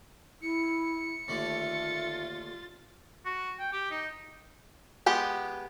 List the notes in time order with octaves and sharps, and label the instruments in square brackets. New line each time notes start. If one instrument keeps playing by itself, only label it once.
[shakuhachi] E4 [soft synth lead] C#7
[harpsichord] D#2 D3 A3 [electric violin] F4 A6 [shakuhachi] E5
[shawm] F#4
G5
G4
D#4
[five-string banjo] G#3 B3 G4